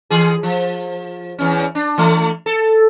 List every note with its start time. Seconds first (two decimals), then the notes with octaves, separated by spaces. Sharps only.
0.10 E3 G#4
0.43 F3
1.38 E2 C#4
1.75 D4
1.98 E3 A3
2.46 A4